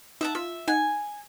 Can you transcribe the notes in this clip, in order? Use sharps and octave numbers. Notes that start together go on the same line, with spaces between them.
D#4 E5 F#5 A5
F4 E5
D#4 F#5 G#5